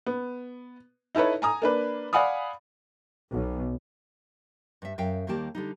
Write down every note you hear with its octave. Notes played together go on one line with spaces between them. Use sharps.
B3
D#4 E4 A4 B4 C#5
G#5 A#5 D#6
A#3 D4 B4
D5 F5 F#5 G#5 B5 D#6
B1
G2 E5
F#2 E5 F5 G5
D#2 D#3 G3 A#3 G4 A5
D3 G3 D#4